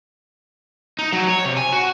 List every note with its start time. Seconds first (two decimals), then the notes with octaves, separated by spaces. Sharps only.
0.99 D#4
1.13 F#3
1.29 C#5
1.45 C3
1.57 G#5
1.73 F#4